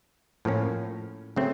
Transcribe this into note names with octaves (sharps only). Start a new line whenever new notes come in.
A2 F3 A#3 C#4
C#3 F#3 A3 C4